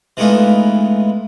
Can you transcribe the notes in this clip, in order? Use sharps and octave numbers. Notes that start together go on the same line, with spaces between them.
E3 G#3 A3 B3 D#4 F4